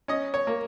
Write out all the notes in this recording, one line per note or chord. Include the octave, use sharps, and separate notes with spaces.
C#4 D#5
C#5
A#3